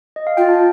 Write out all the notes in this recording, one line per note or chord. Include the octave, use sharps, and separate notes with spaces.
D#5
F5
F4 G5
A5